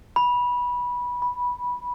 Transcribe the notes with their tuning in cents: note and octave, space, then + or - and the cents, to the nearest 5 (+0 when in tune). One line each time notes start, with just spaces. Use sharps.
B5 -15
B5 -10